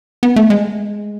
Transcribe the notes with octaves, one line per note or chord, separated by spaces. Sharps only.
B3
A3
G#3